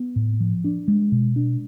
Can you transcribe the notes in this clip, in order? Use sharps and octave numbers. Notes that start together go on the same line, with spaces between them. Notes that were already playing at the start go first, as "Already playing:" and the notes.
Already playing: B3
A2
F3
D4
G#3
B2
D4